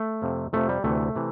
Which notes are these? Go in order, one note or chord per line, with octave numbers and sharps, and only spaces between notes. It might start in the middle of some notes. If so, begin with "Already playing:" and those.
Already playing: A3
F2 C3 F3
F2 C3 F3 A3
G3
D2 C3 E3 A3
C3 E3